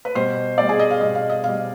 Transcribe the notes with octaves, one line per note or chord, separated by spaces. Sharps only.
B4
B2 G3 C5
B2 G3 D5
G#4
D#5
F5
B2 G3 D#5
F5
D#5
B2 G3 F5